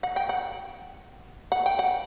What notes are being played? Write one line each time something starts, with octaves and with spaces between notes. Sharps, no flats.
F#5
G5
F#5
F#5
G5
F#5